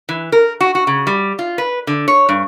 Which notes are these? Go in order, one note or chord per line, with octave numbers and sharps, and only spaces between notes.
E3
A#4
F#4
F#4
C#3
G3
F4
B4
D3
C#5
G2